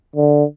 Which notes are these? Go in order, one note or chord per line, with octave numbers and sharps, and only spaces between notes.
D3